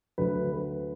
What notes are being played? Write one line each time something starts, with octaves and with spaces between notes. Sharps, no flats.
D2 D3 F#3 B4
B4